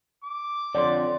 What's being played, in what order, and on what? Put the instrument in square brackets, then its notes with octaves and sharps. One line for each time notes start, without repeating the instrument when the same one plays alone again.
[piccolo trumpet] D6
[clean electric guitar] F2 D3 [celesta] C#5 C6 [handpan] D5